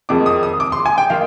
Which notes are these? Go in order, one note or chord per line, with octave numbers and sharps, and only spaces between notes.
F2 D#3 G#3 D6
D#6
D#6
D6
C6
G#5
G5
D#3 F5